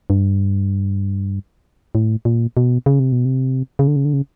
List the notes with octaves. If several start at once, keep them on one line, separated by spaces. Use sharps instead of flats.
G2
A2
A#2
B2
C#3
C3
B2
C3
C#3
D3
C#3
D3
C#3